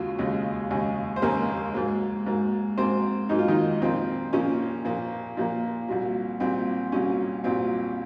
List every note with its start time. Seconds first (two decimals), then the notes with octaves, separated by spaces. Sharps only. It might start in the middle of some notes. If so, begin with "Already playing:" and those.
Already playing: D#2 C#3 F#3 G#3 F4 F#4
0.19 D#2 C#3 G#3
0.71 D#2 C#3 G#3
1.16 C5
1.22 D#2 C#3 G#3 A#3 A#4
1.74 G#2 F#3 A#3
2.26 G#2 F#3 A#3
2.78 G#2 F#3 A#3 C4 C5
3.29 G#2 F#3 A#3 D#4
3.39 F4
3.48 D#3 D#4
3.81 A#2 F3 A#3 C4
4.33 A#2 F3 A#3 C#4
4.85 A#2 F3 A#3
5.37 A#2 F3 A#3
5.88 C2 A#2 F#3
6.40 C2 A#2 F#3 C4
6.92 C2 A#2 F#3 C#4
7.44 C2 A#2 F#3 C4